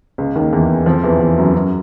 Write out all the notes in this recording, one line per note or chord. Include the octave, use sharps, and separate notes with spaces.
C#2 C#3
D#2 D#3
E2 E3
F2 F3
E2 E3
E2 E3
F#2 F#3
F#2 F#3